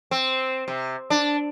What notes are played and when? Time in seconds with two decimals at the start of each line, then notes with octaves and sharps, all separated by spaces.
0.11 C4
0.68 C3
1.10 D4